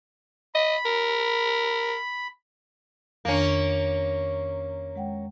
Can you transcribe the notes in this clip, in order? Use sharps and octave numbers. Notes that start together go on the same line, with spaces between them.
D#5 B5
A#4
F2 D#3 A#3 C#4 D4
G#3 F#5 G5